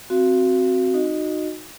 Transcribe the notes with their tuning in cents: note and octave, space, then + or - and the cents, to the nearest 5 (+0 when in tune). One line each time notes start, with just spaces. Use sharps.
C4 +0 F#4 +0 F5 -30
D#4 -10 F#4 -15 D#5 -10